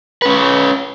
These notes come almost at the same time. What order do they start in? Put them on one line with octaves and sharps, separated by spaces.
B4 C#4 C#5